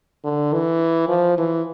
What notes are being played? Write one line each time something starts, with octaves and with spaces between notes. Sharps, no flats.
D3
E3
F3
E3